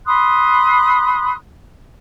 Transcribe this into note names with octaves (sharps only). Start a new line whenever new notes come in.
B5 C6 D#6 F#6